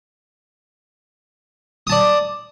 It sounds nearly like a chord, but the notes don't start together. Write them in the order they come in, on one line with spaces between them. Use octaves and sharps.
D#6 A5 D5